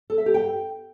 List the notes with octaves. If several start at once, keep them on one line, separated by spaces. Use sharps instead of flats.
A4
E5
G4
G5